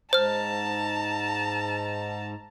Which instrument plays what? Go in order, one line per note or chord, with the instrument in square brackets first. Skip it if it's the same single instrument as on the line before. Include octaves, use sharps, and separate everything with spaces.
[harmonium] G#2 [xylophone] C5 F6 [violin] A5 A#5